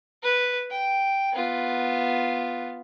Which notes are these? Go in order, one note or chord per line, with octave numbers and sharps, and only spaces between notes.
B4
G5
B3 F4